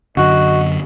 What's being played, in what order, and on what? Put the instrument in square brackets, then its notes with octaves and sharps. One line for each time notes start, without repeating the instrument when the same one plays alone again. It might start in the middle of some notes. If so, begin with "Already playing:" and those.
[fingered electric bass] F#2 D3 [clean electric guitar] F#4 [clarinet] D#5